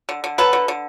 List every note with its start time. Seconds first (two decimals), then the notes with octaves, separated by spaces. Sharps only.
0.09 D3
0.24 D3
0.38 F#3 A4 B4
0.53 D3
0.68 D3